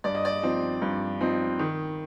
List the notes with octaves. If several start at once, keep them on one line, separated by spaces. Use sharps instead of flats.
G2 D5
D#5
D5
F3 C4 D#4
G2
F3 C4 D#4
D#3